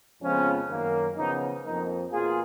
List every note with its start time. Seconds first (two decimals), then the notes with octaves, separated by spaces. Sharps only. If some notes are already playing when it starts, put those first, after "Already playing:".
0.22 F2 C#3 F3 G#3 B3 C#4
0.69 F#2 D#3 A#3
1.16 C#3 F3 B3 D#4
1.64 F2 F3 A#3 D#4
2.11 B2 A#3 F4 G#4